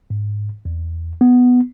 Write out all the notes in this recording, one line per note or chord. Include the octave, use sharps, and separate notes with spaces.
G#2
E2
B3